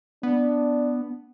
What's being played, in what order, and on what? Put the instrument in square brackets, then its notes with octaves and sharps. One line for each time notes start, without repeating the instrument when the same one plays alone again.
[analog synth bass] B3 [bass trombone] D4